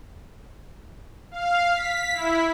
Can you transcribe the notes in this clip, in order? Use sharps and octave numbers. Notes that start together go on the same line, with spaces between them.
F5
B6
E4